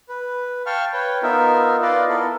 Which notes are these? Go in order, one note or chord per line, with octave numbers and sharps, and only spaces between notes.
B4
F5 G5 A5 C#6 F6
B4 C#5 G5
B3 D#4 F4 A#4 E5
F4 B4 D5 D#5 F5
B3 E4 A4 A#4